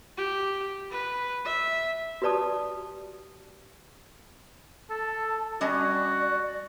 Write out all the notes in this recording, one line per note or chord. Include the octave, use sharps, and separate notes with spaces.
G4
B4
E5
F#4 G4 B4 D5 A5 D#6
A4 A5
G3 C#4 F#4 D5 D#5